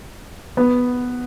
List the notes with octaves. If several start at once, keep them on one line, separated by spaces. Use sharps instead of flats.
B3